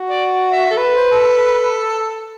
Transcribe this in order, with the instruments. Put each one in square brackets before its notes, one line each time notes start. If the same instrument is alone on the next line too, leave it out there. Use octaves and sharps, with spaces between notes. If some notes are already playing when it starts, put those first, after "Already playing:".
Already playing: [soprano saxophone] F#4
[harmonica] D5
E5
[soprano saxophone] A4
B4
[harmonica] C5
A4